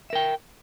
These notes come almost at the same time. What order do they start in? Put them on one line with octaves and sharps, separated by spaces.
E5 A#4 G5